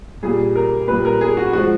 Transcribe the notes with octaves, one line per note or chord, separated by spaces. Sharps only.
A#2 G3 G#4
A#4
A#2 G3 B4
A#4
G#4
F#4
F3 G#3 F#4